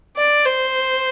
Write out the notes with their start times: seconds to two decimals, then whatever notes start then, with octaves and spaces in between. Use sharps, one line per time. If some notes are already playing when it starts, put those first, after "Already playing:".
0.17 D5
0.45 C5